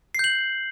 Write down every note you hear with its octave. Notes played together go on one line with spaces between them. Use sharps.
G6 C7 F#7